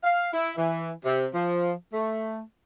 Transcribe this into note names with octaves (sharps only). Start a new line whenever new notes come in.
F5
E4
E3
C3
F3
A3